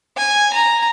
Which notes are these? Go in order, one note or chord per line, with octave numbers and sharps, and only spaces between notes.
G#5
A#5